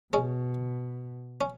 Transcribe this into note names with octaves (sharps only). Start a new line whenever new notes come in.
B2 G#3 C#4
C#4